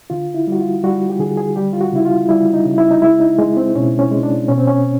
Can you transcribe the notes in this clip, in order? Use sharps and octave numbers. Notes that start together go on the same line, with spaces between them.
D3 F4
E4
G3 F#4
F4
G3 F#4
G4
D3 G#4
G#4
G3 G4
F4
F#4
C#3 E4
F4
G3 E4
D#4
C#3
E4
D#4
G#3 E4
D#4
G#3
C4
B2 C#4
C#4
G#3
D4
B2 C#4
C4
C#4